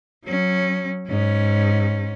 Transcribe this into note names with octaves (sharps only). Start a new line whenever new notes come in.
F#3 C#4
G#2 C#4